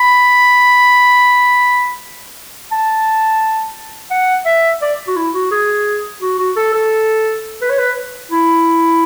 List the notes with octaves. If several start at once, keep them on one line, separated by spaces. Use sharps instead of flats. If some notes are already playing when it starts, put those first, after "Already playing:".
Already playing: B5
A5
F#5
E5
D5
F#4
E4
F#4
G#4
F#4
F#4
A4
A4
B4
C#5
B4
E4